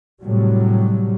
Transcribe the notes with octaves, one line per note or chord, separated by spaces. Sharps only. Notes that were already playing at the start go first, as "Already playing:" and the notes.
A2 C3 F#3 G3